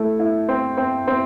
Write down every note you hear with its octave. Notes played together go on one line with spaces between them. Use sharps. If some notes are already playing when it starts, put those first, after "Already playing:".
Already playing: A3 E4
E4
C4
C4
C4